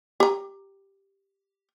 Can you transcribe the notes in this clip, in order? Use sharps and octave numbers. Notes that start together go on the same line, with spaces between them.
G4 A#5